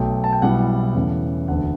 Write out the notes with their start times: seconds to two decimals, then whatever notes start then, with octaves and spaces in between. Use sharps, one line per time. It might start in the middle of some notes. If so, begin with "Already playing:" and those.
Already playing: B1 B2 A3 G5
0.24 A5
0.33 G5
0.42 B1 B2 G3 B3 E4 F#5
0.94 E2 C#3 E3 A3
1.48 E1 D2 D3 F#5